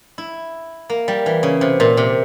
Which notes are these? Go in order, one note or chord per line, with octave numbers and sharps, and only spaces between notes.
E4
A#3
G3
E3
C#3
C3
A#2
C3